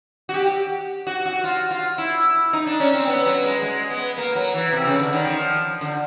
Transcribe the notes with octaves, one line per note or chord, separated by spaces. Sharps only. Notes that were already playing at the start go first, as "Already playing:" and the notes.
F#4
G4
F#4
F#4
F4
F4
E4
D#4
D4
C#4
C4
B3
F#3
G#3
G#3
B3
A#3
F#3
E3
C3
C#3
D3
D#3
F3
D3